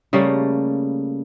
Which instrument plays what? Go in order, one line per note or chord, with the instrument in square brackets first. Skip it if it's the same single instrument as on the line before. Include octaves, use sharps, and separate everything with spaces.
[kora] C#3 G3 A3 A#3